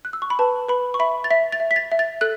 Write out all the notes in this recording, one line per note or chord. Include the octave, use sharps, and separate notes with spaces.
F#6
E6
C#6
B5
B4 A5
B4 B5
C#6
E5 B5
A6
E5 B6
A6
E5
B6
A6
E5
A6
A4 F#6